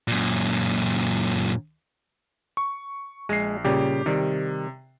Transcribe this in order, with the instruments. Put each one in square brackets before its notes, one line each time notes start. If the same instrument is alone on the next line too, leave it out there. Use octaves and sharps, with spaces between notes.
[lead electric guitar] F#2 A#2
[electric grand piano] C#6
[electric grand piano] A#1 C7 [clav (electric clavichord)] G#3
[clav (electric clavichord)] A#2 C#3 G3 [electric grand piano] G4
[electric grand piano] C3 [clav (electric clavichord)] D#3 G3